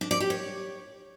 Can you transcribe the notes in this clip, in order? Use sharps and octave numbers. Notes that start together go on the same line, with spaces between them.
D4
D5
G4
C#5